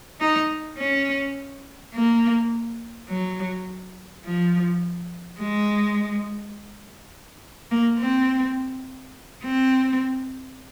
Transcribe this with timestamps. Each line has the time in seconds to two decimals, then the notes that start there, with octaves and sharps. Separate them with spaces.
0.20 D#4
0.78 C#4
1.94 A#3
3.09 F#3
4.25 F3
5.40 G#3
7.71 A#3
7.99 C4
9.43 C4